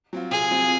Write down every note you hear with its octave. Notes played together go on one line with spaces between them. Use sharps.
F#3 C4 F4
C3 G#4
F#3 C4 F4